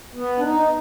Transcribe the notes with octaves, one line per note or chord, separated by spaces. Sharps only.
B3
D4
D#4